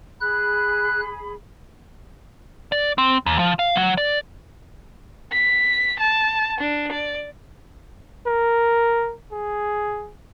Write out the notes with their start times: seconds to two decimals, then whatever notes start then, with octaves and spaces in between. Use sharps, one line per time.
0.21 G#4 B5 F#6
2.72 D5
2.98 C4
3.26 D#2
3.39 F3
3.59 F5
3.76 F#3
3.97 D5
5.32 B6
6.00 A5
6.61 D4
6.92 D5
8.27 A#4
9.32 G#4